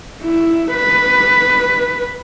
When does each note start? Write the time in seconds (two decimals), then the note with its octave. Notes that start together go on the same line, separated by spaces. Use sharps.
0.23 E4
0.74 B4